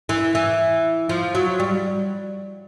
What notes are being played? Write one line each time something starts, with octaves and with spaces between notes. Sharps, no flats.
E3
E3
F3
F#3
G3